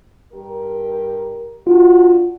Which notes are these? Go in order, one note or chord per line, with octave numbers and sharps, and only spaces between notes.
G2 G4 A#4
D4 F4 F#4